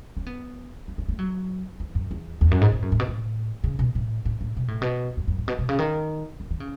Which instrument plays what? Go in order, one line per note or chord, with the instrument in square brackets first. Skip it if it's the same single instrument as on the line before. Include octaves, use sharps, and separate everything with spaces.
[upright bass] C#4
B3
A3
A3
A3
F#3
E3
F#2
E2
E2
F#2
G#2
A2
F#2
A2
B2
A2
C#3
B2
A2
A2
A2
B2
A2
B2
F#2
F#2
A2
B2
B2
C#3
D#3
D#3
D#3
C#3